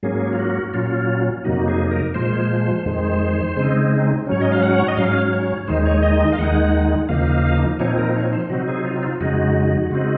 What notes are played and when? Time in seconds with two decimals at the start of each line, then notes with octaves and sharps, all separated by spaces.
0.03 G#2 F#3 A#3 C#4 G#4
0.33 F4
0.39 F#4
0.74 A#2 F#3 C#4 F4
1.44 F2 C3 F#3 A#3 D#4 F#4
1.68 G#4
1.91 A#4
2.14 A#2 F3 G#3 C5
2.85 F2 D#3 G#3
3.57 C#3 G#3 C4 D#4
4.27 G#2 F#3 C#4 C#5
4.41 D#5
4.52 F5
4.63 F#5
4.78 C#5
4.88 D#5
4.97 G#2 F#3 C#4 F5
5.33 C#5
5.67 D#2 D#3 G#3 D#4 C5
5.86 C#5
6.03 D#5
6.20 D#5
6.32 F5
6.38 D#2 D#3 G#3 D#4 F#5
7.09 D#2 C#3 F3 A#3 D#4 F5
7.79 A#2 F3 C4 D#4 C#5
7.98 A#4
8.16 C#5
8.33 C5
8.50 C3 F#3 C4 D#4 F#4
8.68 G#4
8.85 F4
9.03 F4
9.21 F2 C#3 G#3 D#4 F#4
9.91 C#3 G#3 C4 D#4